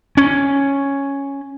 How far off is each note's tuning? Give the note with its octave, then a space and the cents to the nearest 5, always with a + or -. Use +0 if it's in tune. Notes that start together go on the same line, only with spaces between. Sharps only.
C#4 +0